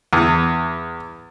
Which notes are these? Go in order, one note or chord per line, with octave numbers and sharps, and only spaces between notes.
E2